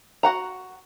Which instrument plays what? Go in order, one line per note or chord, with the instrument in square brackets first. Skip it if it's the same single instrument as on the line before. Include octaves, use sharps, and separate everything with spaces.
[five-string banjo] F#4 F#5 A#5